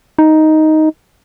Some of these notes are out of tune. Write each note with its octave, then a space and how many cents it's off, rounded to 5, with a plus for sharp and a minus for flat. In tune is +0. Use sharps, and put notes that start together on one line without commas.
D#4 +5